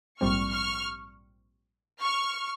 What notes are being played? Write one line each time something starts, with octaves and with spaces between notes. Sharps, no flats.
A#1 G#2 G3 C4 C#6 F6
C#6 F6
C#6 F6